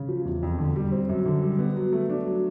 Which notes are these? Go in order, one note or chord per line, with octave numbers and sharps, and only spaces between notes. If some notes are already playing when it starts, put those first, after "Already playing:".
Already playing: C#3
F3
E2
F2
D3
G3
C4
F#2
D3
G3
B3
F#3
A3
D4
F#3